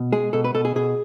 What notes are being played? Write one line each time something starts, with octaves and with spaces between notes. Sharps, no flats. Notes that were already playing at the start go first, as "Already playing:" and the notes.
Already playing: B2
G#3 G#4
B2 A4
B4
B2 A4
G#4
B2 G#4